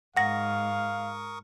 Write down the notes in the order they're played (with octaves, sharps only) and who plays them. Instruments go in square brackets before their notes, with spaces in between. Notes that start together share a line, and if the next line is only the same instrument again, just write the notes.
[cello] G#2 [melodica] A#4 C#6 D#6 [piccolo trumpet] F5 [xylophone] F#5 A#6